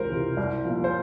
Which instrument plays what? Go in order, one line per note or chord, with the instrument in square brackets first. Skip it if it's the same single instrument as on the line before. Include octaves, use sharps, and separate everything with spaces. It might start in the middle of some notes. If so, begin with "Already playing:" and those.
Already playing: [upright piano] C#2 C3 E3 A#4 C5
C3 E3
C2
A#2 F3
C5